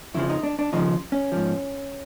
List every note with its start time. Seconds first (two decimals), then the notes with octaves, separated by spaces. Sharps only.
0.14 F2 C#3 F3 E4
0.30 D#4
0.44 D4
0.59 D4
0.73 D#2 C#3 F3 D#4
1.12 C#4
1.32 G#2 F3